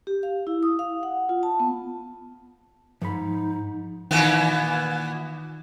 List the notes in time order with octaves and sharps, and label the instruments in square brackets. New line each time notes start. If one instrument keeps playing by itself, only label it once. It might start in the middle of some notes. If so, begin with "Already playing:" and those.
[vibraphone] G4
F5
E4
D#6
F5
F#5
F4
A5
B3
[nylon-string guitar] G#2 [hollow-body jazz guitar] F3 B5 [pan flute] D#4
[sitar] A#2 E3 B3 [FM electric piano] D#3